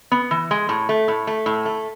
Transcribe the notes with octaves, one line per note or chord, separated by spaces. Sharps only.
B3
E3
G#3
A2
A3
A2
A3
A2
A3